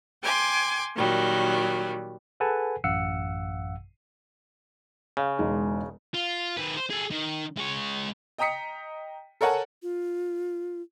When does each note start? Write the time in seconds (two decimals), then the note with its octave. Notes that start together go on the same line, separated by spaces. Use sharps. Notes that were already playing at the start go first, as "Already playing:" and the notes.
0.23 G5 G#5 C6 D6
0.96 A#2 D#3 F#3 G3
2.40 G#4 A4 B4 F#5 G#5 A5
2.84 A1 F#2 F5 F#5 E6 C#7
5.17 C#3 F5
5.38 E1 G#3 D#4
6.14 F4
6.57 D#3 B4
6.77 C5
6.90 G#4 A4
7.11 D#3
7.57 G#3 C#5
8.38 D#5 G5 A#5 D#6 B6 C#7
9.41 A4 A#4 C#5 F#5 G#5 A5
9.83 F4